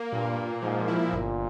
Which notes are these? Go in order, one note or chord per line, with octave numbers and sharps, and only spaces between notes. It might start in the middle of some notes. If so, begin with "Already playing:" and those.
Already playing: A#3
G2 A#2
A#3
G#2 F3
E4
G1 A#2